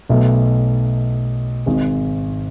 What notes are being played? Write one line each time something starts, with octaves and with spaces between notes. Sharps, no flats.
B1 B2 A3
G#1 G#2 G#3